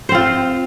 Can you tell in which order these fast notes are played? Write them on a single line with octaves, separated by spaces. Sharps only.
C5 C4 F4